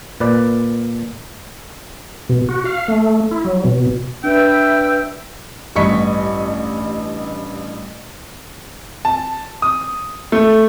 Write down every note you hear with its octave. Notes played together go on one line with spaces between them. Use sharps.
A#2 B4 D5
B2
F#4
F5
A3
E4
F#3
B2
D4 B4 E5 G5 E6
A1 G2 D#5 C#6 B6 C#7
A5
D#6
A3